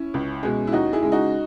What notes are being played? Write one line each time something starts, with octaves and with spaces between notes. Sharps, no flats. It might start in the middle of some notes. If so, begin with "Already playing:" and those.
Already playing: C#4 E4
C#2
B2 G#3
E4
D#2 D#4 F#4
E4 G#4
C#3 G#3
D#4 F#4